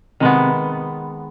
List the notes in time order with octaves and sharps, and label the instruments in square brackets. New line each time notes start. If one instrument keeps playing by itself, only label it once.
[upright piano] C3 [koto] D#3 G#3 B3